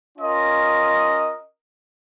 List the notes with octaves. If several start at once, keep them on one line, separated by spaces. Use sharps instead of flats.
C#4 F4 A#4 D#5